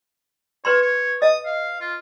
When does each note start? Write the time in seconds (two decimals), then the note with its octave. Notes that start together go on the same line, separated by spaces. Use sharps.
0.65 B4 C#5 C6
0.82 C#5
1.22 D#5 D#6
1.45 F5
1.81 F4